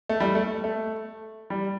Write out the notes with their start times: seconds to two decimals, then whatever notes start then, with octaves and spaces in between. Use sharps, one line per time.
0.09 A3
0.20 G3
0.35 A3
0.64 A3
1.50 G3